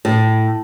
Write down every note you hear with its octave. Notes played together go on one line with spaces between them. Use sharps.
A2